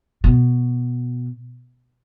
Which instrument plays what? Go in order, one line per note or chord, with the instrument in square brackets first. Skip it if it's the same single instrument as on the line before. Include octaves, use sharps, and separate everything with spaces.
[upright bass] B2